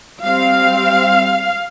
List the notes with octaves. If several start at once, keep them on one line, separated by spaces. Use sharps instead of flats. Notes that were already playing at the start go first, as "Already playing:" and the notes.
G3 C4 F5